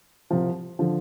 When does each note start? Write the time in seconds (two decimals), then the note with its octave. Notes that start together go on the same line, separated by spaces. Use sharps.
0.30 C2 C3 F3
0.79 D3 F3